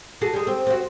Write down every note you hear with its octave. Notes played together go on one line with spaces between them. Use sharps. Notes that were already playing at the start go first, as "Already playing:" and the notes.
F#4 G#4 A4
G3 G#3
C4
C4 F#4